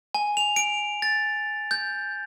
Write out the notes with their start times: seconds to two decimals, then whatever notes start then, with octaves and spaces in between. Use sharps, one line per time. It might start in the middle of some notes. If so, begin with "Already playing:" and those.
0.14 G#5
0.37 F7
0.56 D7
1.02 A6
1.71 G6